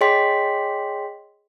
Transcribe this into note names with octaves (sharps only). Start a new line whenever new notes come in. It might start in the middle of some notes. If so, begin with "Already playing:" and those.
G#4 C#5 D#5 G5 C6 B6